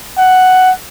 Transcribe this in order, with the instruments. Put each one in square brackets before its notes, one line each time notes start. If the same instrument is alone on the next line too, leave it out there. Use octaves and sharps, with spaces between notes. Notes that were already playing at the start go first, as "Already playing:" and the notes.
[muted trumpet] F#5